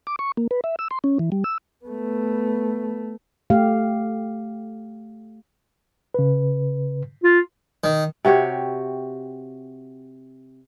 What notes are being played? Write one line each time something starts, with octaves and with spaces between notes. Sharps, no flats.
D6
C#6
A#3
B4
E5
E6
C6
C#4
E3
G3
E6
A3 B3
A3 G4 F5
C#3 B4
F4
D#3
C3 F#4 G4 C#5